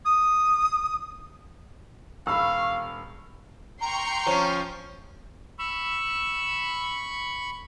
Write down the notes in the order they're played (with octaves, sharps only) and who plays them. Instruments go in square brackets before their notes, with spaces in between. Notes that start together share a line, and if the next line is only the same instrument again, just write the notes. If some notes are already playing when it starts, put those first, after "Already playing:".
[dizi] D#6
[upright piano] E1 B5 [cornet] F5 [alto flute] C#6 [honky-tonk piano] E6
[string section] G5 C6 C#6 [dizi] A#5
[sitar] F3 C#4
[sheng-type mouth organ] B5 C#6 [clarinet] E6